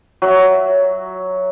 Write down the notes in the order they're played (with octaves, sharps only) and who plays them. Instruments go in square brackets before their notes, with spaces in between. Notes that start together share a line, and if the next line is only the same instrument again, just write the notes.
[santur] F#3 E5